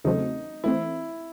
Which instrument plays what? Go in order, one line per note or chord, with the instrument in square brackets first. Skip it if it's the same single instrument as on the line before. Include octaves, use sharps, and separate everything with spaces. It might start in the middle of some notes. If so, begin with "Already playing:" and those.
[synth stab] E2 C#3 F#3 A3 C4 [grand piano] D#4
[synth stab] E3 A3 C4 [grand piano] E4